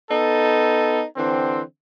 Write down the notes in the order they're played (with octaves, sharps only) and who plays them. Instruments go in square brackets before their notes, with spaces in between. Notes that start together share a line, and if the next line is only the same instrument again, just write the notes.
[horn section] B3 D#4 A4
D3 E3 C4